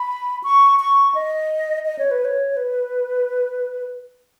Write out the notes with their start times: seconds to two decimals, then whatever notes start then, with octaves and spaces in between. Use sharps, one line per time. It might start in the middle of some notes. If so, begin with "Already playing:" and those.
Already playing: B5
0.44 C#6
0.79 C#6
1.15 D#5
1.85 D#5
1.99 C#5
2.11 B4
2.25 C#5
2.57 B4